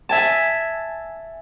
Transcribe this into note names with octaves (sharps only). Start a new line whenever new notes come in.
E5 G#5 A5